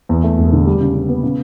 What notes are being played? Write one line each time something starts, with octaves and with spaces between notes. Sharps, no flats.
E2
A3
E1
D3
G3
C#3
C#3
B3
C#3